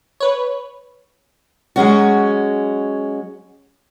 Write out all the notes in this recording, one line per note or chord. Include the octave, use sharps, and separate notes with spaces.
B4 C#5
F#3 G#3 C#4 F#4